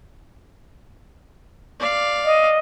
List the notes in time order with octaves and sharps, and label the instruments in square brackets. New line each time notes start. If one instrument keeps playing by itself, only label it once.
[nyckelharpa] D5 F5
[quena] D#5